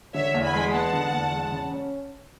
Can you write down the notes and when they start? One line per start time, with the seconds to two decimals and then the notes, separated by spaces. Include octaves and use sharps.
0.14 D3 C#5 E5
0.34 E2
0.43 G#5 B5
0.54 G#3
0.73 B3 F#5 A5
0.93 D3
1.12 E2
1.32 G#3
1.52 C#3
1.71 C#4